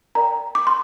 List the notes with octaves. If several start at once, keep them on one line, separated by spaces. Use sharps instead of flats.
A#4 D5 G5 A#5
D6
C6